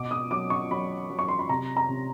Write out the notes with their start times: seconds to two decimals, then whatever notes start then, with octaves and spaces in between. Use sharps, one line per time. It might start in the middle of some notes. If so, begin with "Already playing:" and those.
Already playing: B2 D6
0.11 D#6
0.31 F#3 D6
0.50 C#6
0.71 F#3 B5
1.10 F#3
1.19 C#6
1.28 C6
1.39 B5
1.49 C3 A#5
1.77 A#5
1.89 C3